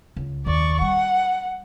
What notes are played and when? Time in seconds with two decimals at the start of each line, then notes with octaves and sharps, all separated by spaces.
0.16 C#2
0.46 F#1 D#2 D5 C#6
0.81 G3 F#5